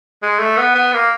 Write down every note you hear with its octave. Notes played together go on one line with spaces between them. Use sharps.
G#3
A3
B3
B3
A#3